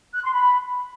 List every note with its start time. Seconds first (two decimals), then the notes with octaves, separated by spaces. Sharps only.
0.13 F#6
0.23 C6
0.33 B5